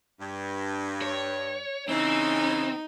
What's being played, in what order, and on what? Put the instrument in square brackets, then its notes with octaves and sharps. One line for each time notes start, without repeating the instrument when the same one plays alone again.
[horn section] G2
[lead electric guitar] C#5
[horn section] C#3 E3 [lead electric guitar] C4 [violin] D#4